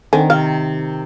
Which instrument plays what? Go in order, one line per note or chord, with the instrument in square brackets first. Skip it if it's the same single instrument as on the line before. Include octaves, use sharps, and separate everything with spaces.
[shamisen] D3 C4 G#5 [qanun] D#3
[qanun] C3 [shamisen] F5